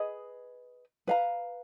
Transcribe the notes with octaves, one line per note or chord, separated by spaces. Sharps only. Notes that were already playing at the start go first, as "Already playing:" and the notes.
Already playing: G#4 B4 D#5
B4 F5 A#5